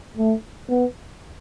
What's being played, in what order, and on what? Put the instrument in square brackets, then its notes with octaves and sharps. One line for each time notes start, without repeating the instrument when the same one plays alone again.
[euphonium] A3
B3